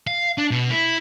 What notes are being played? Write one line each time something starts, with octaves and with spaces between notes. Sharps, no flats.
F5
D4
B2
E4